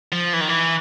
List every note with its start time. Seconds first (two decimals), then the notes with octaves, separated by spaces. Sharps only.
0.12 F3
0.33 E3
0.41 D#3
0.49 E3